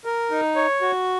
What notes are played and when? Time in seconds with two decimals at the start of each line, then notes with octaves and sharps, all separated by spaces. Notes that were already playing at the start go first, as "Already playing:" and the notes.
0.05 A#4
0.31 D#4
0.56 C#5
0.82 F#4